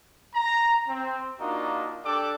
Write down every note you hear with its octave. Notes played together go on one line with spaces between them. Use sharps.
A#5
C4
A#3 D4 D#4 F4 F#4
D4 G4 A4 D5 D6